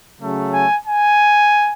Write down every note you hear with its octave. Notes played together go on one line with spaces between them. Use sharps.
C#3 F#3 A3 C#4
G#5
G#5